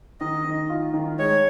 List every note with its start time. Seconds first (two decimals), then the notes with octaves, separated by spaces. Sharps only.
0.20 D#3 D#5
0.45 D#3
0.69 F4
0.94 D#3
1.19 G#3 C#5